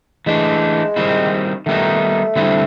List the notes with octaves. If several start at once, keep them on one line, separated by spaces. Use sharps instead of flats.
E3 G#3 A3 D4
D#3 G3 C4 E4
D#3 G3 A3 B3 D#4
D3 G3 C4 E4